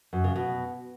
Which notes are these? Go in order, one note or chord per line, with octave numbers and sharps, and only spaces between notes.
F#2
C#3
B2